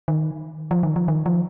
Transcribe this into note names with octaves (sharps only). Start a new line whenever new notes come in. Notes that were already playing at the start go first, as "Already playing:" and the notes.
D#3
F3
D#3
F3
D#3
F3